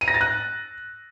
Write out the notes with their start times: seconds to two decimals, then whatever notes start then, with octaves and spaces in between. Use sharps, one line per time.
0.01 D#7
0.08 A#6
0.14 A6
0.21 F#6